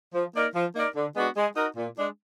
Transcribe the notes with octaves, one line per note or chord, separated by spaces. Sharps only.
F3
A#3 D#4 A#4 D5
F3
A#3 D#4 A#4 D5
D3
G#3 B3 D4 F#4
G#3
D#4 F#4 A#4
A#2
G#3 D4